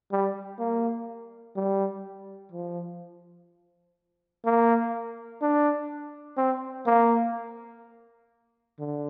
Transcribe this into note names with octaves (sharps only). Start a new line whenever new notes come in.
G3
A#3
G3
F3
A#3
D4
C4
A#3
D3